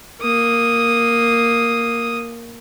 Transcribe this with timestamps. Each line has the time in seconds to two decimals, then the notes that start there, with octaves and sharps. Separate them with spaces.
0.21 A#3 D#6